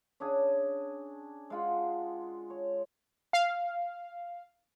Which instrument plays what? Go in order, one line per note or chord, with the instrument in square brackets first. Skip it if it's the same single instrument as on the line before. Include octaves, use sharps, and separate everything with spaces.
[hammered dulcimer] C#4 D4 G#4
G#3 F4 F#5
C#5
[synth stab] F5